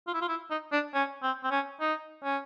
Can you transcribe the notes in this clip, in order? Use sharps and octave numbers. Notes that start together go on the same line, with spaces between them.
F4
E4
F4
E4
D#4
D4
C#4
C4
C4
C#4
D#4
C#4